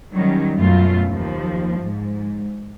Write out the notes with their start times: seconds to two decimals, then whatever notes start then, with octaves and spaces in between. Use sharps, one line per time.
0.14 D#3 F#3 G3 C#4
0.57 F#2 B2 A3 F4
1.08 D#2 F3
1.80 G#2